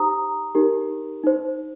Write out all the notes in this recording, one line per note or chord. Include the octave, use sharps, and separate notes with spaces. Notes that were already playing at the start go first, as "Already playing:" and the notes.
Already playing: D#4 G4 C5 A#5 D#6
D#4 G4 A#4
D#4 C5